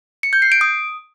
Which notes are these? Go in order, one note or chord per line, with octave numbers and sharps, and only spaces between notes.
C#7
G6
C7
D7
D#6